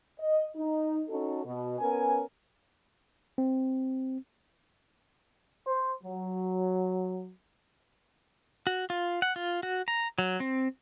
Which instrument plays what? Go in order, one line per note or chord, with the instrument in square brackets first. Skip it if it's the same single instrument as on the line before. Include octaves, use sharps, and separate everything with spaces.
[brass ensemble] D#5
D#4
C#4 D#4 F#4 A4
B2
B3 C#4 A#4 G#5
[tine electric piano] C4
[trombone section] C5
F#3
[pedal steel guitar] F#4
F4
F#5
F4
F#4
A#5
F#3
C4